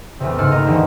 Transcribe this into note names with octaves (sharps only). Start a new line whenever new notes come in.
A1 E2 C3
G#2 C#3 A4 F6 F#6
D#2 A3 D#5 A#5
D2 G#2 D#3 E3 G3 A3